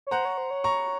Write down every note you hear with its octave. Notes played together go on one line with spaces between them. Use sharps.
C#5
C5 F#5 A#5
C#5
C5
C#5
A#5 C#6